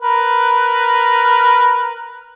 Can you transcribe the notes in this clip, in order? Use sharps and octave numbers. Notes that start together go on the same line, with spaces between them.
A#4 B4